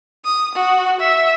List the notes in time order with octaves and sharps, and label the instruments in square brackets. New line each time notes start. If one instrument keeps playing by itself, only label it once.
[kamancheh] D#6
F#4
E5